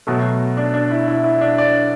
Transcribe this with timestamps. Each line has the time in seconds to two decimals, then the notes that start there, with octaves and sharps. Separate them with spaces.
0.07 B2 F#3 A3
0.57 D4
0.74 D4
0.91 E4
1.08 E4
1.24 E4
1.41 D4
1.58 D5